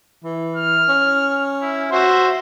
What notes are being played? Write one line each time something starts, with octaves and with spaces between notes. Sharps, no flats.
E3
F6
C#4
E4
F#4 C5 E5 C6